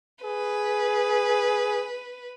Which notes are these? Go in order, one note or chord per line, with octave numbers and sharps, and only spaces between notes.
G#4 B4